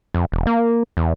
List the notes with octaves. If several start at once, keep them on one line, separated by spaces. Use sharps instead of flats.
F2
E1
A#3
E2